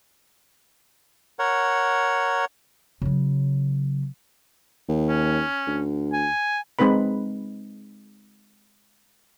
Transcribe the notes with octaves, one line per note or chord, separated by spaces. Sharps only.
A#4 C#5 F#5
C#3 F#3
D#2
C#4
D2
G#5
G#3 C4 D#4 B4 B5